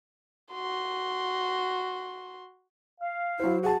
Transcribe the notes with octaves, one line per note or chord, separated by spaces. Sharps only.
F#4 C6
F5
F#3 E4 C5
F#4 G#4 A5